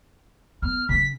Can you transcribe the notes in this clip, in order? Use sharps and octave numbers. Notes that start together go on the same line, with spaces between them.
B3 F6
C#3 C#4 B6